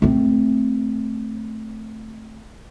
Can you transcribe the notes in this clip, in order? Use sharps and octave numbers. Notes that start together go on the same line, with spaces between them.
A3 C4